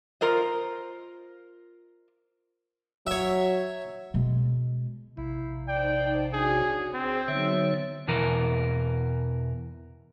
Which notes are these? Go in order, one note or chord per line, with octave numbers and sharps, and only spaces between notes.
F4 A#4 C5 D#5
F#3 C#5 E5
B2 G#3
A#1 C3 E4
D#4 C5 D5 G5 A5
D4 F#4 G#4 C#5
C4 G#4
D3 F#3 B3 D#4 C#5 E5
E2 B2 E3 A#4